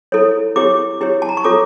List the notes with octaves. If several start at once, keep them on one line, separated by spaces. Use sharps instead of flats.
E4 A4 C#5
E4 G4 C#5 D6
E4 G4 C#5
A5
A#5
C#6
F4 A4 C#5 D6